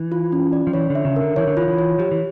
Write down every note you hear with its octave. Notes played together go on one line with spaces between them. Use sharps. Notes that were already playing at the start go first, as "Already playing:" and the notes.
Already playing: E3
F4
C#4
D5
F3
E3 C#5
D3
E5
C#3
D3 A#4
E3 C#5
D3
E3 F4
E3
C#5
F3 G4
E3